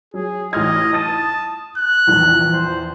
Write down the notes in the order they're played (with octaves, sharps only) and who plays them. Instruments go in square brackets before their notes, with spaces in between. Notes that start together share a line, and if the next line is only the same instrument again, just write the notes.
[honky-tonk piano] F#3 [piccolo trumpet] G#4
[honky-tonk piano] A1 F6 G#6 [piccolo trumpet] D#5
[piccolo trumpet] A5 [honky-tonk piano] D#6 A6 D#7
[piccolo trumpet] F#6
[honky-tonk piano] A#1 E2
[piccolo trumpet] C5